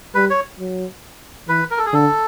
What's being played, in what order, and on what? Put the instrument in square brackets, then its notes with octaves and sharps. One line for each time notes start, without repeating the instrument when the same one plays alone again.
[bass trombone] G3 [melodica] B4
[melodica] C#5
[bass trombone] F#3
[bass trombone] E3 [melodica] B4
[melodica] A#4
A4
G#4
[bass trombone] D3 [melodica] A4